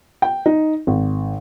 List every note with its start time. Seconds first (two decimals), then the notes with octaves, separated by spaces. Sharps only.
0.22 G5
0.46 D#4
0.87 G#1